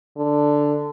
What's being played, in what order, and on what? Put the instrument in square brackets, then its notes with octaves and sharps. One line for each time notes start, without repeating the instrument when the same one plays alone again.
[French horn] D3